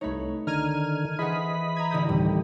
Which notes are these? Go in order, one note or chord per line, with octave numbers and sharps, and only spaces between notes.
C2 A3 D#4 B4 C#5 B5
D3 D#3 A#5 F6 G#6 D#7
E3 G#4 C5 D#5 F#5 B5
A#5 G#6
A1 D3 D#6 G6
D2 A2 C3 D#3 E3 G3